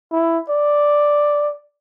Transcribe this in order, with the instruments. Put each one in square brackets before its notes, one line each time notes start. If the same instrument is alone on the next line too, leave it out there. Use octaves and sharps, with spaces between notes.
[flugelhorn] E4
D5